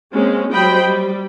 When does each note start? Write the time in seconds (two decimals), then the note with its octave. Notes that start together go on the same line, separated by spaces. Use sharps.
0.12 G#3 A#3 C4 C#4
0.52 F#3 G3 C5 D#5 G5 B5
0.84 G3